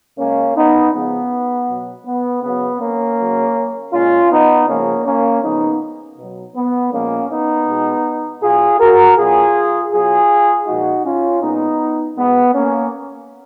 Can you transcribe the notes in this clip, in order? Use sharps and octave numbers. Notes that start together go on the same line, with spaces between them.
C#3 G#3 A#3 C#4
B3 D#4
C#3 F3 G#3 B3
B2 F#3
B3
C#3 F#3 B3
A#3 C#4
C#3 F#3
A#2 G#3 C#4 F4
B3 D#4
C#3 F3 G#3 A#3 C#4
A#3 C#4
C#3 F3 G#3 B3 D#4
B2 F#3
B3
A#2 F3 G#3 A#3 C#4
B3 D#4
B2 G#3
B2 F#3 F4 G#4
F#4 A#4
B2 F#3 F4 G#4
B2 F#3 F4 G#4
A#2 F3 G#3 D#4 F#4
C#4 F4
A#2 G#3 B3 D#4
B2 G#3 B3
A#3 C#4